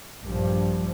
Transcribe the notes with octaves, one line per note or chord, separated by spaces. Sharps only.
A#1 G2 F3